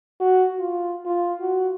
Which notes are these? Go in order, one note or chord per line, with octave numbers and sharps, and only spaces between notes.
F#4
F4
F4
F#4